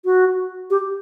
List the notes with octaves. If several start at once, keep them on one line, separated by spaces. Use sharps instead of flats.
F#4
G4